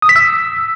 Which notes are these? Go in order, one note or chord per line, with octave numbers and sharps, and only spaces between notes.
D#6
B6
E6